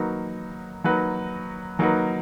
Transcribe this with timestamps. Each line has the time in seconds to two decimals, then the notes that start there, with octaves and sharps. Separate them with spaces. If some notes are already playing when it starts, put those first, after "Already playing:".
Already playing: F#3 A#3 D#4 F#4 B4
0.84 F#3 A#3 D#4 F#4 B4
1.79 F#3 A#3 D#4 F#4 B4